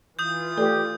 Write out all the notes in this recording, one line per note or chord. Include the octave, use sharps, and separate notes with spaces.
E3 F4 D#6 G6
A3 G4 A4 D5